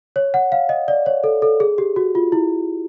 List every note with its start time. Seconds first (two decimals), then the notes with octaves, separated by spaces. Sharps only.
0.16 C#5
0.34 F#5
0.52 F5
0.69 D#5
0.88 D5
1.06 C#5
1.24 A4
1.42 A4
1.60 G#4
1.78 G4
1.96 F#4
2.15 F4
2.32 E4